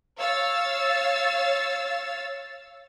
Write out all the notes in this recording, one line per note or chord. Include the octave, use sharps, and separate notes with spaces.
C#5 F5 E6 A6